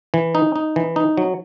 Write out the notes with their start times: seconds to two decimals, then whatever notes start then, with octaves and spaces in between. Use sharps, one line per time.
0.14 E3
0.35 D#4
0.56 D#4
0.76 E3
0.96 D#4
1.17 F#3